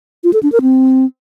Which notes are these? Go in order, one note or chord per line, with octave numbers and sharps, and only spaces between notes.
F4
A4
D4
A#4
C4